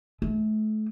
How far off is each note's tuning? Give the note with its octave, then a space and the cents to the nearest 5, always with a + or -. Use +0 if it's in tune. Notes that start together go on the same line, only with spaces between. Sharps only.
A3 -35